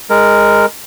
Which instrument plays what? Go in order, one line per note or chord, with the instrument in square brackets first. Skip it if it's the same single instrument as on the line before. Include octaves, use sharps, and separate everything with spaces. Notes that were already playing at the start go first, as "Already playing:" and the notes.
[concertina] G#3 A#4